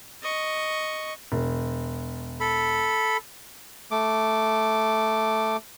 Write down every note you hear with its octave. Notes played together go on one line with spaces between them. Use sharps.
D#5 C#6
E1
A4 B5
A3 D6